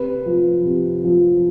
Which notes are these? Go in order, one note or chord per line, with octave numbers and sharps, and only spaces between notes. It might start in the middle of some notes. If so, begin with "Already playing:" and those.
Already playing: C3 B4
F3
C3
F3